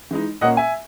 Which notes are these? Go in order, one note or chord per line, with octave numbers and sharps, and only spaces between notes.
E3 G#3 D#4
A#2 A#3 C#4 D#5 F#5
E5 G#5